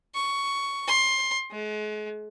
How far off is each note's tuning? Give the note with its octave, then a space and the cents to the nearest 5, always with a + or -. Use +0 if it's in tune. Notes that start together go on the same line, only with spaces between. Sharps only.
C#6 +10
C6 +20
G#3 +40